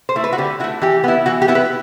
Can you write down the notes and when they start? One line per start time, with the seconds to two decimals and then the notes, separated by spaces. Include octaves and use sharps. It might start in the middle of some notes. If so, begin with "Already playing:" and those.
0.09 C5
0.16 A3 E4
0.24 B4
0.32 F#4
0.38 D3 G4
0.60 E4 F#4
0.64 A3
0.82 E3 G4
1.04 B3 E4
1.26 E3 F#4
1.42 G4
1.48 B3 E4
1.55 B4